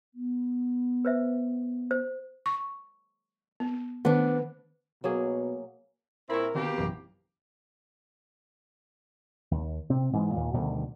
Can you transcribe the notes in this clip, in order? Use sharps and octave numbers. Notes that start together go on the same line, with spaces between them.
B3
B4 C5 E5
C5
C#6
B3
D#3 B3 D4
B2 F#3 A#3 G#4
A#2 C4 E4 A#4 B5 C#6
B2 D3 D#3 A#3 C4 G4
A#1 F#2 C3 E3
D#2
C3 C4
G#2 E3 F3 G#3
D#2 A#2
D2 B2 D#3 G3